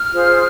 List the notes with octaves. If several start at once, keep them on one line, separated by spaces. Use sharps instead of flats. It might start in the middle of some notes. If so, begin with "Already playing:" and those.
Already playing: F6
F4 G#4 C5